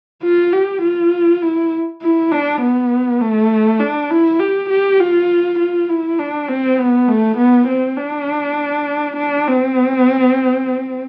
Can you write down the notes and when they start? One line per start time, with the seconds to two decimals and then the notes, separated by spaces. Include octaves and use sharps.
0.23 F4
0.52 G4
0.82 F4
1.42 E4
2.02 E4
2.31 D4
2.61 B3
3.21 A3
3.80 D4
4.10 E4
4.39 G4
4.70 G4
5.00 F4
5.59 F4
5.89 E4
6.18 D4
6.48 C4
6.78 B3
7.08 A3
7.37 B3
7.67 C4
7.97 D4
9.16 D4
9.46 C4